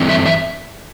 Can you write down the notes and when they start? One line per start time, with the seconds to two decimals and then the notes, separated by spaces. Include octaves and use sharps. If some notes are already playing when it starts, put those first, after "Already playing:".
Already playing: G2 E3 A3 C4
0.09 E5
0.26 E5